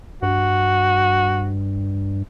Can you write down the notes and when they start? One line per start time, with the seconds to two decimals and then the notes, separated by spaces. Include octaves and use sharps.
0.23 G2 F#4